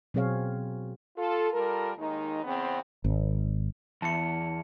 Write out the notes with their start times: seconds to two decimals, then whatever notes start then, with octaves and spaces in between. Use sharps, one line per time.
0.14 B2 F#3 C4 G#4 C#5 F5
1.17 F4 A4
1.52 G3 F4 A4 A#4
1.98 D#2 D#3 G#3 D#4
2.44 E2 C#3 B3 C4
3.04 G#1
4.02 E2 A5 C#7